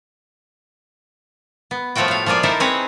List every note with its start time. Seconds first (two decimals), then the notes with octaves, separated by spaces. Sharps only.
1.71 B3
1.95 A2 F3 A3 F4 F#4 G5
2.08 A3 F5
2.26 F3 A#3 F4 G#4 D5
2.43 D#4 E4 A4 A#4 C5 E5
2.60 C4 G#4 B4 C#5